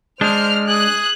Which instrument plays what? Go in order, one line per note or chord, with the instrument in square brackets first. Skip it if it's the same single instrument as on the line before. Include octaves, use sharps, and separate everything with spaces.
[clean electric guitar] G#3 D4 [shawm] C5 [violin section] F6
[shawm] G#4 [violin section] F#6